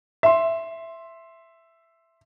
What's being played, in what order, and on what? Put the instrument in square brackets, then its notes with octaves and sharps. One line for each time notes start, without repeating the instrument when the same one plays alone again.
[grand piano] E5 C6